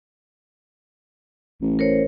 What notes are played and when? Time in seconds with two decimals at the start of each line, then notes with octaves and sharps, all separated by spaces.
1.62 A1
1.79 A#4 C5 C#5